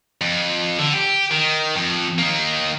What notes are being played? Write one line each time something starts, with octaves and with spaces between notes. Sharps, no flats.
F2
D3
G4
D#3
F2
D#3 A#3